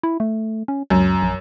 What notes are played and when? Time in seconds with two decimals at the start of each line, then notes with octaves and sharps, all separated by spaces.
0.03 E4
0.20 A3
0.68 C#4
0.90 C#2 F#2
1.22 A#1